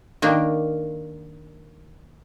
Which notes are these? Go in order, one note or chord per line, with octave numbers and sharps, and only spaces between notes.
D#3 A#3 D4